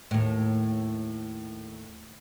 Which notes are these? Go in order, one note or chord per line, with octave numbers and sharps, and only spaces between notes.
D#2 A2